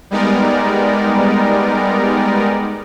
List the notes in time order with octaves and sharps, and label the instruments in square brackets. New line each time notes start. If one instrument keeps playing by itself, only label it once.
[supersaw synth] G3 G#3 B3 D#4 A#4 D5